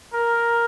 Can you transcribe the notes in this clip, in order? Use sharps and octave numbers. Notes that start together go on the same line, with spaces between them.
A#4